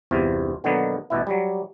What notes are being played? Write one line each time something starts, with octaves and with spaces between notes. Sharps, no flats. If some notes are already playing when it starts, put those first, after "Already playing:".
G1 E2 C3 F4
B2 D3 D#3 F#3 A#3 B3
A1 B2 E4
F#3 G3